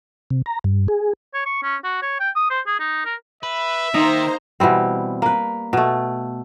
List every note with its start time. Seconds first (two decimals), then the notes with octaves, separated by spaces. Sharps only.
0.30 C3
0.46 A#5
0.64 G2
0.88 G#4
1.34 C#5
1.45 C#6
1.63 C#4
1.84 F#4
2.02 C#5
2.20 G5
2.36 D#6
2.50 C5
2.67 G#4
2.80 D#4
3.05 A#4
3.43 B4 E5
3.94 D#3 A#3 D#4 C5 A#5
4.60 B2 E3 G3 C4
5.22 A#3 B4
5.73 B2 A3